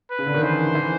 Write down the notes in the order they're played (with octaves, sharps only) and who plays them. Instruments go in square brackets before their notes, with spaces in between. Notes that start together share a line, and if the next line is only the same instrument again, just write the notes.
[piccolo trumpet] B4
[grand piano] C#3
D3
D#3
[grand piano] E3 [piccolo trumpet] C5
[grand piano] E3